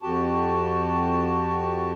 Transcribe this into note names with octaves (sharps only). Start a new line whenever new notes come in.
F2 F#4 G4 A5